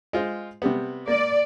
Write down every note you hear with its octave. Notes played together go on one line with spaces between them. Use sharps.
G#3 F4 C5
C3 G3 B3
A#3 D5